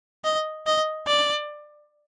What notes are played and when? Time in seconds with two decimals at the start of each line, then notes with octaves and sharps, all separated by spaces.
0.25 D#5
0.67 D#5
1.07 D5